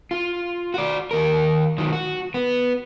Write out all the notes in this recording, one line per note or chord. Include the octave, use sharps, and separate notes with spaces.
F4
F#4 D5
D#2 A#4
D#3 F#3
F#4
B3